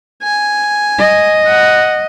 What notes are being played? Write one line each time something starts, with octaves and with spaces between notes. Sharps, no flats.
G#5
D#5
F#5